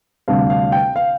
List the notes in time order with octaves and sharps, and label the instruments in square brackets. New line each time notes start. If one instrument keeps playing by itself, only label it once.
[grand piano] D2 C3 G3 D4 F5
F5
G5
F5